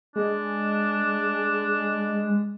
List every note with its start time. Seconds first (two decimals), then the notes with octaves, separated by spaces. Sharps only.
0.16 G#3 D4